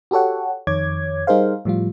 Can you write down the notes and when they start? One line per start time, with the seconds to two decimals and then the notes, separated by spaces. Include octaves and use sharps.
0.11 F#4 G4 A4 C#5 F#5
0.67 F2 D#3 C#5 D6 G#6
1.27 G3 D#4 G#4 A#4 C5 F5
1.65 A2 F3 G3 F4